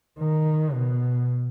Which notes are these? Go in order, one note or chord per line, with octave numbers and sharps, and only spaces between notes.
D#3
B2